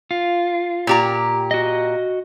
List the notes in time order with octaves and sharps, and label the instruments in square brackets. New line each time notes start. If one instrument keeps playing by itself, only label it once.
[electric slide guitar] F4
[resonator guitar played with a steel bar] A#2 G4 A#5
[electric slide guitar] F#4 D#5